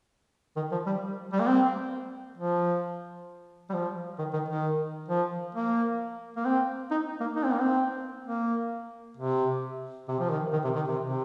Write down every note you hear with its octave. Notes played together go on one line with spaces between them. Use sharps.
D#3
F3
G3
G3
A#3
C4
F3
G3
F3
D#3
D#3
D#3
F3
A#3
A#3
C4
D#4
A#3
D#4
C4
A#3
C4
A#3
C3
C3
F3
D#3
D#3
C3
D#3
C3
C3